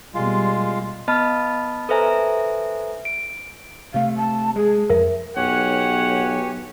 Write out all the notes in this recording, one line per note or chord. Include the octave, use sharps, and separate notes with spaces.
B2 G3 G#3 A#3 F4
B3 D#5 A5 B5 F6
A4 B4 C5 E5 G#5 A#5
D7
C3 A3 F5
A5
G#3 G#4
F2 A#4 E5
B1 G4 C#5 F#5 G#5